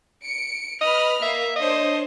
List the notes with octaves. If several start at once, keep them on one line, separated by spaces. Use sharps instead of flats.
C#7 D7
B4 D#5 B5 F6
A#3 E5 F5
D4 C5 C#5 D#5